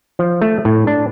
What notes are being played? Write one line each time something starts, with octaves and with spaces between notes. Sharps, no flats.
F3
A3
A2
D4